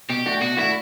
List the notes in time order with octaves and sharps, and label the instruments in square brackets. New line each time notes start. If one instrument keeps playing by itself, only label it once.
[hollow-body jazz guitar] B2 [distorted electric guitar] G4
[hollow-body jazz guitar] A3 D4 F#4
[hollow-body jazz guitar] B2 [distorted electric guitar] F#4
[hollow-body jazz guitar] A3 D4 F#4 [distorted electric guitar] E4